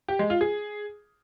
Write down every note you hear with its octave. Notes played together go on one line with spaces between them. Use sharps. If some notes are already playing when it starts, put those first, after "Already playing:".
G4
G#3
F4
G#4